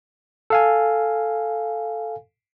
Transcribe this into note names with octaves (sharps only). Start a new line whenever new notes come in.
A4 F5 G#5